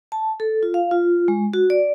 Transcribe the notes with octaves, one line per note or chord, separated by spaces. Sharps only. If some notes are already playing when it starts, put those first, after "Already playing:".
A5
A4
F4
F5
F4
G#3
F#4
D5